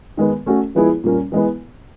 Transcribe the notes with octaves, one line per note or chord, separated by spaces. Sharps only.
D#3 G#3 B3
A3 C#4 F#4 A4
F3 G#3 B3 E4 G#4
A#2 G3 A#3 C#4
E3 G#3 B3